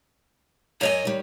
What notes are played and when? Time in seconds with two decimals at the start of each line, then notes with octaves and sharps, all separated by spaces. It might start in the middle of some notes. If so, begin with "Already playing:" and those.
0.81 F#2 C#5 D#5 G#5
1.05 D#3 G3